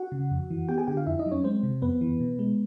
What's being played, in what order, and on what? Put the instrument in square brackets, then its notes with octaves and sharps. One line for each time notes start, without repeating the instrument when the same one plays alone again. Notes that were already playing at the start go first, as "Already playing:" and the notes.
Already playing: [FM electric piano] F#4 F#5
C#3
F2
E3
B3 G4 G5
G#4 G#5
D3 G4 G5
F4 F5
F2 E4 E5
D#4 D#5
F#3
C#4 C#5
G#3 C4 C5
C3
F2 B3 B4
E3
B2
G#3